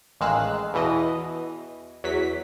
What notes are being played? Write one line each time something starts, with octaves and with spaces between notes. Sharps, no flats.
A1 D#3 G#3 F5 E6 F#6
E2 B2 E3 D#5
E2 F#3 B6